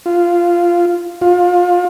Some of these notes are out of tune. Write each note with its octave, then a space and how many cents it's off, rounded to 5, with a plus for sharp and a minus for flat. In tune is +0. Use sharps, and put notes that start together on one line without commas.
F4 -10
F4 +25